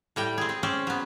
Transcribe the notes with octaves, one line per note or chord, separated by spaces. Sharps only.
A2 G3 G5
C4 G#4
C4
C4 C#4 C5 D5
F#3 B3